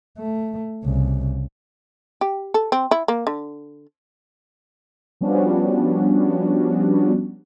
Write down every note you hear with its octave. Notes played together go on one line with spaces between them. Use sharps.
A3
C2 C#3
G4
A4
C4
E4
A#3
D3
F3 G3 B3 C#4 D4 F#4